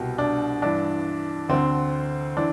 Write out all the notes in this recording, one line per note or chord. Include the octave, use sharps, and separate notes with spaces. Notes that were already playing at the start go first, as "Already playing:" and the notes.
Already playing: C2 B2 G4
D4
G2 E3 D4
D2 D3 C4
E3 D4